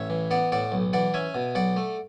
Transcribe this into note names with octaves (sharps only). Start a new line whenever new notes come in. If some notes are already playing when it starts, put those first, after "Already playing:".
Already playing: A1 C#5 E5
E3
B3 D5 F#5
A2 D5 F#5
B1
E3 D5 F#5
C#4 E5 G#5
B2
B1 D5 F#5
A3